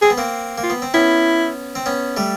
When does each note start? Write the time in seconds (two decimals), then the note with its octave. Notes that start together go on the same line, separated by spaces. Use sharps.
0.02 C4 G#4
0.10 B3
0.18 A#3 C4
0.58 A#3
0.63 F4
0.70 B3
0.82 C4
0.94 B3 C#4 E4
1.75 C4
1.86 B3 C#4
2.17 G3 A3